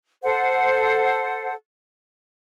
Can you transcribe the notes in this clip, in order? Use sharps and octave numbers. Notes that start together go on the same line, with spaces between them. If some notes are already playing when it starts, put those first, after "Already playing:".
A4 C5 F#5